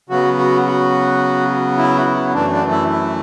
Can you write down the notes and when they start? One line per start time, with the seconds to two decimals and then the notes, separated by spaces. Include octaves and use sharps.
0.09 C#3 F#3 B3 F#4
0.38 F#4
0.66 F#4
1.77 E4
1.97 F#4
2.06 E4
2.33 F#2 E3 A3 D4
2.52 D4
2.71 E4
2.90 E4